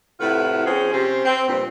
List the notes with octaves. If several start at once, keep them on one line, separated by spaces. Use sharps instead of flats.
A2 C3 E4 F4 B4 F#5
F3 C4 C#4 G#4
C3 C#4 G4 C5
C4
G2 A#2 F3 C4